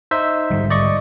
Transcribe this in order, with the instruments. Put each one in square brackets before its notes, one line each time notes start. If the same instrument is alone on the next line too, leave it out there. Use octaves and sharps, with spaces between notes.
[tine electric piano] D#4 C5 E5
[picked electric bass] G#2 D3 G3
[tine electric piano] D5 D#5 C#6